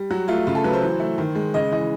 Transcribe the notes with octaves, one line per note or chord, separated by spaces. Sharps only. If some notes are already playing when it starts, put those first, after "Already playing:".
Already playing: G3
F#3 F#4
A3 F4
C#3 F4
A4
F#3 B4
C5
E3
A3
D#3
G#3
C#3 D#5
E3 D#5